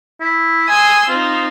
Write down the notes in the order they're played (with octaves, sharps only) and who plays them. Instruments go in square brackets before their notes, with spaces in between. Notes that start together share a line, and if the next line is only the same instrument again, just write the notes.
[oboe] E4
[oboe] G#5 [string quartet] C6 D#6 E6
[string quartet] C4 D#4 [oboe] F4